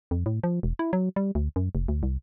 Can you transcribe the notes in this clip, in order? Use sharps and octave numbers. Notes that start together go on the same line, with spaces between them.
F2
A2
F3
E1
E4
F#3
G3
D2
F#2
F1
D2
C2